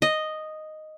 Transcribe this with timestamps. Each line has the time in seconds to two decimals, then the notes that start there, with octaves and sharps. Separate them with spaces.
0.02 D#5